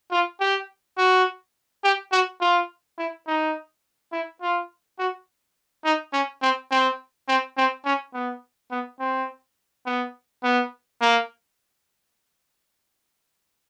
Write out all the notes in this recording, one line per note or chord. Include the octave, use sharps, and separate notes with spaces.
F4
G4
F#4
G4
F#4
F4
E4
D#4
E4
F4
F#4
D#4
C#4
C4
C4
C4
C4
C#4
B3
B3
C4
B3
B3
A#3